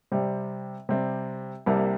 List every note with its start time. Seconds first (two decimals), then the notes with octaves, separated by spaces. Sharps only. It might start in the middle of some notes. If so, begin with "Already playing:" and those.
0.12 C3 G3 C4
0.89 C3 G3 C4
1.66 C2 C3 G3 A#3